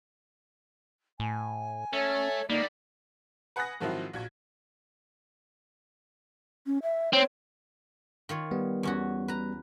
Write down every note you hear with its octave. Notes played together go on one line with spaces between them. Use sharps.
A2 G#5
C#4 A4 C#5 E5
D3 G3 A#3 D#4 D5
B4 F#5 G#5 D#6 F#6 A#6
G#2 D#3 F3 F#3 C4 E4
A#1 F#4 G#6
C#4
E5
C4 C#5
D#3 F4 C#5
G3 B3
E2 C#4 F#4
B4 A#5